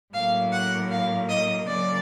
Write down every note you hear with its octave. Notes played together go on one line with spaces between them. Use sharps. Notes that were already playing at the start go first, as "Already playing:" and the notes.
A2 F#3 A#3 F5
F#5
F5
D#5
C#3 F#3 A#3 D5